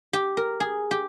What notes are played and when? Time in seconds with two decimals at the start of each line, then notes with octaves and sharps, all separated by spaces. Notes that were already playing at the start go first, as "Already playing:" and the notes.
0.13 G4
0.37 A#4
0.60 G#4
0.91 G4